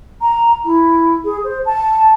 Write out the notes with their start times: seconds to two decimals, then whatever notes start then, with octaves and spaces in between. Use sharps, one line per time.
0.21 A#5
0.64 E4
1.24 G#4
1.44 C5
1.65 A5